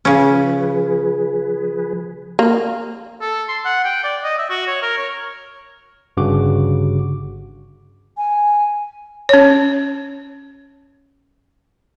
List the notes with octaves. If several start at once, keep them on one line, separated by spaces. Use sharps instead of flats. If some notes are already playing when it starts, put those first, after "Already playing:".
C#3 F3 C#4 G#4 B4
A#3
A4
C6
F#5
G5
D5
D#5
E5
F#4
C#5
A#4
C#5
G1 G2 C#3 F#4 D6
G#5
C#4 C#5